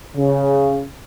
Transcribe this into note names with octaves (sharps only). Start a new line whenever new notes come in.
C#3